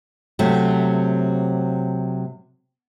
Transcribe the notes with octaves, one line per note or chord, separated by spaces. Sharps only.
C3 F#3 A3